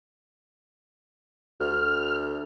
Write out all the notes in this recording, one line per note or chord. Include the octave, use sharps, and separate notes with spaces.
D2 F6